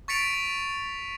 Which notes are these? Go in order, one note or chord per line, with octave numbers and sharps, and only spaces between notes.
C#6 A6 B6 C#7 D7 F7